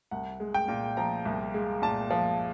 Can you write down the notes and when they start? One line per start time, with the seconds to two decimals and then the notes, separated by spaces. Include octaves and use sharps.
0.11 C2 F#5
0.40 G#3
0.54 G5
0.68 A#2
0.97 F3 A#5
1.25 C2
1.54 G#3
1.82 A#2 A5
2.10 F3